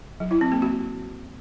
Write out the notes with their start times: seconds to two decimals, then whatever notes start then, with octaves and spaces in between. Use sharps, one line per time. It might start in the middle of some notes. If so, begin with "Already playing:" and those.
0.20 F#3
0.31 E4
0.41 C4
0.52 A#3
0.62 F#4